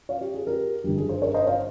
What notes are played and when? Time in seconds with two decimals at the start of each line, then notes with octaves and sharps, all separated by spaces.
0.09 C#5 F5
0.21 G4
0.34 G#4
0.47 G4 A#4
0.84 G1 G2 D#3 G4
0.97 G#4
1.09 G#4 C5
1.22 A#4 C#5
1.34 C5 D#5
1.46 C#5 F5